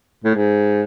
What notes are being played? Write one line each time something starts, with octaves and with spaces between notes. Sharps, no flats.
A2
G#2